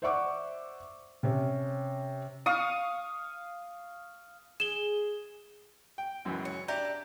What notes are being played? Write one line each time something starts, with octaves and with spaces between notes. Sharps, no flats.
C5 D5 E5 F#5 C#6 D6
C3 C#4
F5 C#6 D#6
G#4 E7 G7
G5
C#2 F#2 E3
C#5
D4 G4 D5 E5 A#5